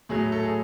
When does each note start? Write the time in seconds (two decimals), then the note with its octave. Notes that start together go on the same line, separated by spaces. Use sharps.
0.09 A2 F#3 A3 G#4
0.32 A4
0.43 G#4